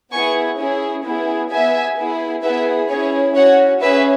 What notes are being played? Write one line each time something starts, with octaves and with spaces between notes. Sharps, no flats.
B3 E4 G#4 G#5 C#6
C#4 E4 G#4
B3 E4 G#4
B3 G#4 E5 G#5
B3 E4 G#4
B3 E4 G#4 B4 E5
C#4 E4 G#4 C#5
C#4 F#4 C#5 F#5
C#4 G#4 B4 E5